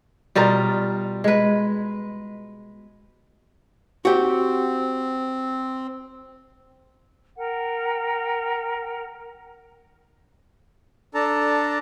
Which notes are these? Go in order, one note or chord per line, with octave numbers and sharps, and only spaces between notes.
B2 G3 F4 A#4
G#3 B4
C4 F#4 G4
A#4 F#5 G5
D4 A4 A5 A#5